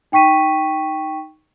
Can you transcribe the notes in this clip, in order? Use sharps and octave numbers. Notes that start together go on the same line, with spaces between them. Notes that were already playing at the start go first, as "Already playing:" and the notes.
D#4 G5 C#6 B6 D#7